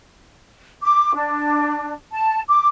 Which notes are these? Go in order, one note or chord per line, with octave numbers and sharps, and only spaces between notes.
D6
D4
A5
D6